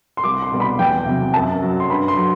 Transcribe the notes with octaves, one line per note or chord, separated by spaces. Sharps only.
C6
C2 D6
C6
B2 G3
B5
E2 G5
C3 F#3
F#2 A5
F#3
C6
G2 B5
C6
F#3